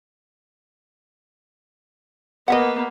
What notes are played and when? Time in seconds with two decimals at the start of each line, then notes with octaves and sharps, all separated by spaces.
2.48 A#3 B3 D#5 E5 F#5